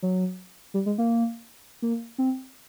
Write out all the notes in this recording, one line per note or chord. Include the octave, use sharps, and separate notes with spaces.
F#3
G3
G#3
A#3
A#3
C4